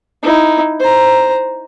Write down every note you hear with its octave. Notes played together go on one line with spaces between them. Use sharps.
D#4 E4
C5 A#5